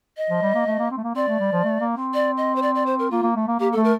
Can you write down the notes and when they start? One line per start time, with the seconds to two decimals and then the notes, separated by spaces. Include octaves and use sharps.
0.17 D#5
0.30 F3
0.42 G3
0.54 A#3
0.66 A3
0.79 A#3
0.91 C4
0.97 A3
1.04 A#3
1.15 C4 D5
1.28 A3
1.40 G3
1.52 F3
1.64 A3
1.80 A#3
1.97 C4
2.14 D5
2.37 D#5
2.56 C5
2.62 D5
2.75 D5
2.86 C5
2.99 A#4
3.11 A#3 F4
3.23 A#3
3.36 A3
3.48 A#3
3.60 A#3 G4
3.73 A4
3.76 A3
3.84 A#4